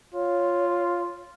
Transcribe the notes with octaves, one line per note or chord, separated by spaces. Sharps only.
F4 C#5